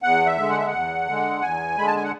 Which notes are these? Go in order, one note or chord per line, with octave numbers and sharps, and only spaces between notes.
E2 F#5
E5
D3 G#3
F#5
E5
F#5
E2
D3 G#3
E2 G#5
D3 G#3 B5
A5
G#5
F#5